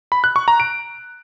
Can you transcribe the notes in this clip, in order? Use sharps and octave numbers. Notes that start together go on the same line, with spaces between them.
B5
F#6
C#6
A#5
D7